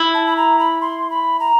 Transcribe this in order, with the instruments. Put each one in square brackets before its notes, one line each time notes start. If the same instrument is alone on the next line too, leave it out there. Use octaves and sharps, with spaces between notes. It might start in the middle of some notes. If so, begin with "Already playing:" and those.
Already playing: [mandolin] E4
[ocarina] A5
B5
A#5
B5
C6
B5
A#5